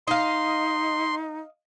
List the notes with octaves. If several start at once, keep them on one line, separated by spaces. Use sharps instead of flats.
D#4 D#5 F5 C6